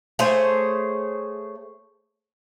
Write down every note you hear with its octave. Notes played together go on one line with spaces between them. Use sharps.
A3 G#4 C5 C#5